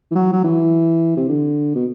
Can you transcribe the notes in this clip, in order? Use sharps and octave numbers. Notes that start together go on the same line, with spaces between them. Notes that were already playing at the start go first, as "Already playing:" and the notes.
E3
F#3
F#3
E3
C3
D3
B2